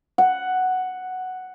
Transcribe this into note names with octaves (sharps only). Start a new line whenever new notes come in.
F#5